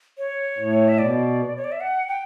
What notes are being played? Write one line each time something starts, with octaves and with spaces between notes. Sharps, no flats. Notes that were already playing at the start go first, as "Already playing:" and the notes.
C#5
A2
E5
B2 D5
C#5
D5
E5
F#5
G5